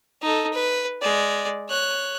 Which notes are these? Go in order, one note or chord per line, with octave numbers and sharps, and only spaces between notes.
D#4 A4
B4
G#3 D5
C#5 F#6